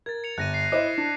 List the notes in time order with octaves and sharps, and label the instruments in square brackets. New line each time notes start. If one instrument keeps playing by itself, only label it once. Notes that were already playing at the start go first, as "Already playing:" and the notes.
[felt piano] A#4 [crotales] G#6 A6
[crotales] C#7 F7
[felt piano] G1 [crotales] F#6 A#6 D#7
[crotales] C7
[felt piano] E4 C5 D#5 [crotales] D6
[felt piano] D4